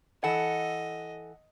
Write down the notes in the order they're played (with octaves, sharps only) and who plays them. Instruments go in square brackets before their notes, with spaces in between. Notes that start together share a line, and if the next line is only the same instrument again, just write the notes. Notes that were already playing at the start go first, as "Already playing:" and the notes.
[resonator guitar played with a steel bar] E3 A4 [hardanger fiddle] D#5 [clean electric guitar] F#5